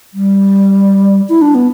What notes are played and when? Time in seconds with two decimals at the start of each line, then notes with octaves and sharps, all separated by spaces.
0.14 G3
1.29 E4
1.42 D4
1.55 B3